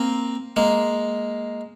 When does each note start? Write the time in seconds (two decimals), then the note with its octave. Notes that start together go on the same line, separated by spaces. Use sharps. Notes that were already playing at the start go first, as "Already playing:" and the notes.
Already playing: A#3 C4
0.56 G#3 A#3